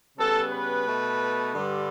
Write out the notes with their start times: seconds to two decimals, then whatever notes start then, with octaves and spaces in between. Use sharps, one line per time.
0.18 C#3 G3 B3 A4
0.52 B4
0.86 B2 A3
1.54 G2 D3 G3